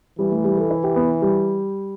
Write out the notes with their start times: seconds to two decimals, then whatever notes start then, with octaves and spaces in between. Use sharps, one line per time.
0.19 E3 G3
0.32 A3
0.44 G3
0.57 A4
0.71 E4
0.84 G4
0.96 B3
1.22 G3